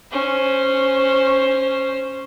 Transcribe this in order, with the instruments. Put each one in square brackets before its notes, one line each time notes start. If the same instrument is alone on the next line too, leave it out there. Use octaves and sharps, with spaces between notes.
[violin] C#4 C5